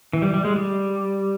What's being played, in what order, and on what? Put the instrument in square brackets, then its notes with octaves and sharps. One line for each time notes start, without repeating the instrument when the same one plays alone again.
[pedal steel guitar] E3
G3
G3
G#3
G3